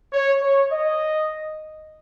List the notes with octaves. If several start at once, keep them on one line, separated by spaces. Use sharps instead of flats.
C#5
C#5
D#5